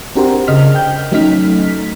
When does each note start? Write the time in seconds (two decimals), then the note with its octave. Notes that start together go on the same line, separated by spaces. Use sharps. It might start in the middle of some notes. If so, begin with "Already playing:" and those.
0.16 C4 D4 F#4 G4 A#4 C5
0.47 C#3 D#5 F6 B6
0.75 G5 G6
1.12 F#3 A3 C#4 D#4 F6 B6